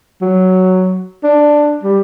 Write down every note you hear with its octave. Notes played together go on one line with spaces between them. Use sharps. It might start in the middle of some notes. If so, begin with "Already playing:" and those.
F#3
D4
G3